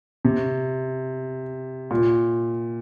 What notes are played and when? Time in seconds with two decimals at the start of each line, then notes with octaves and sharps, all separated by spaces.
0.25 C3
1.91 A#2